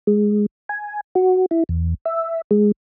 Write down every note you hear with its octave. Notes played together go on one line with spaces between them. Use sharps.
G#3
G#5
F#4
E4
E2
E5
G#3